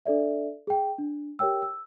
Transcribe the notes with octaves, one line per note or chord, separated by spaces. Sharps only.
D4 A4 D5 E5
G#4 G5
D4
G4 A#4 C#5 G5 E6
E6